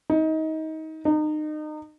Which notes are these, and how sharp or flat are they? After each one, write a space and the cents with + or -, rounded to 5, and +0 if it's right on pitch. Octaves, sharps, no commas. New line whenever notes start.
D#4 +25
D#4 -30